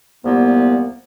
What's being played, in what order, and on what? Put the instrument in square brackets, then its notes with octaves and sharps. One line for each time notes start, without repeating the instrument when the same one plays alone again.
[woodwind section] C2 A#2 A#3 B3